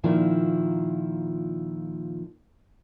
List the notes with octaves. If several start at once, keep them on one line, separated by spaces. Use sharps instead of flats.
A#2 D#3 F3 E4